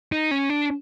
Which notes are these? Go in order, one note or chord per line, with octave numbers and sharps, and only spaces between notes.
D#4
C#4
D4